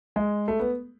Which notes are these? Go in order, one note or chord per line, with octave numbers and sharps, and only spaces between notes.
G#3
A3
B3